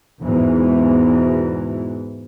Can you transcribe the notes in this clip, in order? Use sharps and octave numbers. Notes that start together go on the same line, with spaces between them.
E2 G#2 B2 E3